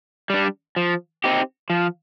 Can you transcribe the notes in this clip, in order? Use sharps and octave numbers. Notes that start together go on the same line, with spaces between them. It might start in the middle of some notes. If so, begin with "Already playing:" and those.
G3 D4
F3
C4 D#4 G4
F3